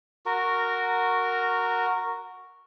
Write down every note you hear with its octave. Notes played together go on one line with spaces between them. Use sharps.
F#4 A#4